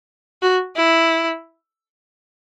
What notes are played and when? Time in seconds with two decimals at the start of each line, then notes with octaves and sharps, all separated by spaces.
0.42 F#4
0.76 E4